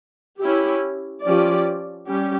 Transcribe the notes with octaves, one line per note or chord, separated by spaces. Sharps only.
C#4 E4 G4
F3 C#4 G4 D5
G3 C#4 G4